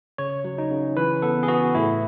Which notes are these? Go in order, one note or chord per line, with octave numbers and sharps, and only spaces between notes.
C#3 C#5
F#3
D#4
C#3
E3 B4
B3 A4
G#4
B3 F#4
A2 E4